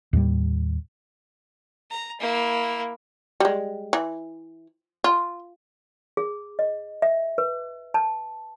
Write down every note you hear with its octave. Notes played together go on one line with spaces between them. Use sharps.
D#2 A2 G3
A#5
A#3 E4
G3 G#3
E3
F4
G#4
D#5
E5
B4
A5